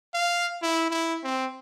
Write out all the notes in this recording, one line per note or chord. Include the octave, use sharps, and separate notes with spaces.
F5
E4
E4
C4